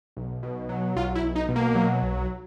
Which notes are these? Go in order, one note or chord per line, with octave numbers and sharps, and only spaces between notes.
B1
B2
F#3
B1 F4
E4
B1
D#4
B2
A#3
F#3
B1